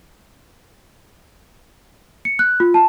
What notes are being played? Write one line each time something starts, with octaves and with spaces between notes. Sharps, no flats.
C#7
F#6
F4
A5